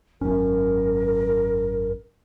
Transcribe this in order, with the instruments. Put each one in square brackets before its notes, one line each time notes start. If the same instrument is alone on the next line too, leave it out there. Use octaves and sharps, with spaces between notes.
[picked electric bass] G#1 F#2 C#4 [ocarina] A#4